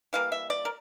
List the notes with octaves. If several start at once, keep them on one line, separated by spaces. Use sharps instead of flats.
E3 G3 A#3 F5
E5
D5
A#4